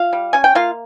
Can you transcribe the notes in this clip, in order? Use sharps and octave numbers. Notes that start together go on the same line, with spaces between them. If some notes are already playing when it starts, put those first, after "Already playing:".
Already playing: F4 F5
G3
C#4 G#5
G5
A#3 F4 F5